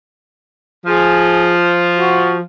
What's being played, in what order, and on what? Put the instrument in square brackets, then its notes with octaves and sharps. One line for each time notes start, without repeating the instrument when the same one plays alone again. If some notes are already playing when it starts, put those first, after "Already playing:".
[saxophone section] F3 [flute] G#4
[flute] F#4